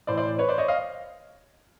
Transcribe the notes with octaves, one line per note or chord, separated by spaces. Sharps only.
A2 E3 C5 D5
C5 D5
B4 C#5
C5 D5
C#5 D#5
D#5 F5